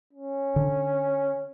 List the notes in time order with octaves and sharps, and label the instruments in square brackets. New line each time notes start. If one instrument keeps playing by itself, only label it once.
[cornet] C#4
[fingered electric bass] D3